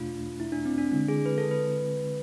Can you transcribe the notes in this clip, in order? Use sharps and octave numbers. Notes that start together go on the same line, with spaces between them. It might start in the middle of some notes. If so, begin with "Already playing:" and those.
Already playing: E2 B2 A3 D4 F4
E4
D4
C4
D4
D3 G#3 C4 D4 E4
G#4
B4
A4
B4